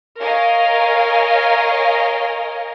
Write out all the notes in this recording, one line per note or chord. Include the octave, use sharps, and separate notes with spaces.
A#4 C#5 D#5 F5 G#5